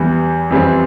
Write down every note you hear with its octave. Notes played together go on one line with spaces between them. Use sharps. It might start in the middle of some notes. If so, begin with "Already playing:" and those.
Already playing: E2 E3 G3
F2 E3 G3 C4